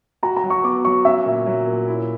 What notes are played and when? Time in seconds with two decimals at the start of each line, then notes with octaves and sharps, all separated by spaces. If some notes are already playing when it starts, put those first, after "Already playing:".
0.23 F#4 A#5
0.37 A#5
0.43 F#3
0.50 C#6
0.64 B3 D6
0.85 F#3 C#6
1.05 C#4 E5
1.26 A#2
1.46 F#3
1.67 A#2
1.88 E4